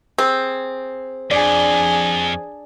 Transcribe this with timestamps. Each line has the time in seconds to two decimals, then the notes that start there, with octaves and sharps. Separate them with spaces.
0.18 C4 G#4
1.31 F2 D4 G#4 D5